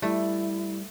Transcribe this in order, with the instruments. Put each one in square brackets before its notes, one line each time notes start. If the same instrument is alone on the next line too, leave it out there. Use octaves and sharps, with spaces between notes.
[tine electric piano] G3 [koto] A3 [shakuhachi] E4